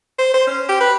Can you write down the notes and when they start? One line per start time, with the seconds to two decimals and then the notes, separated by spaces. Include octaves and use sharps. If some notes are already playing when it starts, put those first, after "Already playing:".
0.19 C5
0.34 C5
0.47 C#4
0.69 G4
0.81 B4